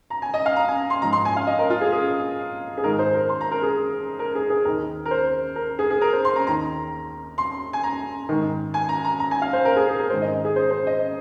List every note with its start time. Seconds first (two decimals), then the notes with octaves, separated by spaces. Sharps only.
0.10 A#5
0.22 G#5
0.34 D#5
0.46 F5
0.56 A#5
0.68 G#5
0.90 C6
1.01 G#2 F3 A#5
1.13 C6
1.25 G#5
1.36 F5
1.47 D#5
1.59 A#4
1.70 F4
1.81 G#4
1.92 G#4
2.78 G#4
2.84 G#2 D#3 A#4
2.99 C5
3.14 A#4
3.29 C6
3.41 A#5
3.52 A#4
3.63 G#4
4.19 A#4
4.35 G#4
4.50 G#4
4.65 D#2 D#3 A#4
5.05 A#4
5.11 C5
5.56 A#4
5.79 G#4
5.90 G#4
6.01 A#4
6.13 C5
6.25 C6
6.36 A#5
6.47 D#2 D#3 A#5
7.38 C6
7.73 G#5
7.83 A#5
8.29 G#2 D#3
8.74 G#5
8.89 A#5
9.05 A#5
9.20 A#5
9.31 G#5
9.42 F5
9.53 C5
9.65 A#4
9.76 G#4
9.88 G#4
9.99 A#4
10.10 G#2 D#3 C5
10.22 D#5
10.45 G#4
10.56 C5
10.71 C5
10.87 D#5